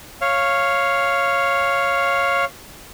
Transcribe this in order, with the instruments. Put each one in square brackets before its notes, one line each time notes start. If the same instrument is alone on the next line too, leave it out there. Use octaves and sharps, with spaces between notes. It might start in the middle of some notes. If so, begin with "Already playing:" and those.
[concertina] C#5 F5